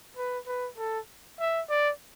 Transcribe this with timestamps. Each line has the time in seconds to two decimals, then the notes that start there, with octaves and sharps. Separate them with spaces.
0.17 B4
0.47 B4
0.78 A4
1.40 E5
1.70 D5